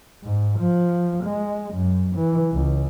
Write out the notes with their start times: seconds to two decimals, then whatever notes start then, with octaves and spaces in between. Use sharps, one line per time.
0.23 G#2
0.59 F3
1.24 G#3
1.74 F#2
2.16 E3
2.53 C#2